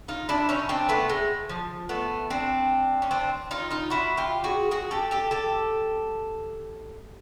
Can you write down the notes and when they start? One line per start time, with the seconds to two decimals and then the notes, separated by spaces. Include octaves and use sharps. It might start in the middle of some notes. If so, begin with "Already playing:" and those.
0.08 D#4 F4
0.29 D4 E4
0.49 C#4 D#4
0.69 C4 D4
0.89 A3 B3
1.09 G#3
1.49 F3
1.89 A3 B3
2.30 C4 D4
3.02 C#4
3.11 C4 D4
3.51 D#4 F4
3.71 D#4 F4
3.90 E4 F#4
4.17 F4 G4
4.44 F#4 G#4
4.71 F#4 G#4
4.91 G4 A4
5.11 G4 A4
5.31 G4 A4